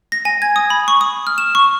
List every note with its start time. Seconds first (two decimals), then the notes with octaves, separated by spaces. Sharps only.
0.12 A#6
0.25 G#5
0.42 G#6
0.56 D#6
0.70 B5
0.88 C#6
1.01 D#6
1.27 F6
1.38 E7
1.55 C#6